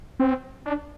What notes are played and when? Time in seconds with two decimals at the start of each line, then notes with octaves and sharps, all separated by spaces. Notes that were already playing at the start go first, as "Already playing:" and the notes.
0.20 C4
0.66 D4